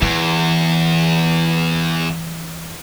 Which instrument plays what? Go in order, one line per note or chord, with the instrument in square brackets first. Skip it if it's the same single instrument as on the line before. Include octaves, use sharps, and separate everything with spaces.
[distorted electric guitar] E2 [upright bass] E3